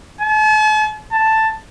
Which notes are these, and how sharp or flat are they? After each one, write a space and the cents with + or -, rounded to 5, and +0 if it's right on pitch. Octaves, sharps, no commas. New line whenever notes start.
A5 -45
A5 +5